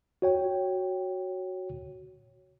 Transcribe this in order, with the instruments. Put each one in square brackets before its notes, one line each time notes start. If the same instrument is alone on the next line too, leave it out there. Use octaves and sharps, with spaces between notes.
[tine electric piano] F#4 C#5 G5